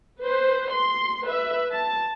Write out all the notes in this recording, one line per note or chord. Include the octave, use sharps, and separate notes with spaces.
B4 C5
C6
B4 E5
A5